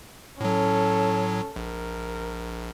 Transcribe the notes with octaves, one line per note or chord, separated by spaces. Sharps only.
A2 F#3 C#4 A4
A#1 A#4